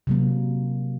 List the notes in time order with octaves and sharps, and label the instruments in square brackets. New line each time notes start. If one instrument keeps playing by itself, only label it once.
[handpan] C3 F#3 A#3